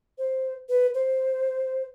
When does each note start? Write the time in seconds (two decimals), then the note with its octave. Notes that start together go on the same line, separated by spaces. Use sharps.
0.18 C5
0.69 B4
0.94 C5